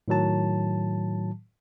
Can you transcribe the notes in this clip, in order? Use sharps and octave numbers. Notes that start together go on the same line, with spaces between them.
A2 D#3 F#3 A5